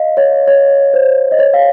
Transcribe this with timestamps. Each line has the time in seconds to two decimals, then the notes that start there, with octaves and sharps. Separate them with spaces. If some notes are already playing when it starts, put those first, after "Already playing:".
Already playing: D#5 F5
0.17 C#5
0.47 C#5
0.94 C5
1.32 D#5
1.39 C#5
1.54 F5